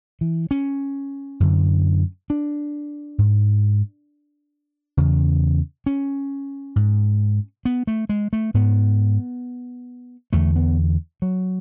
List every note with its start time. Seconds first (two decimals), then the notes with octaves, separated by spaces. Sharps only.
0.21 E3
0.51 C#4
1.40 F#2 D3
2.30 D4
3.18 G#2
4.97 E2 C#3
5.86 C#4
6.76 G#2
7.65 B3
7.87 A3
8.09 G#3
8.33 A3
8.54 G#2 B3
10.33 E2 D3 A3
10.56 B3
11.22 F#3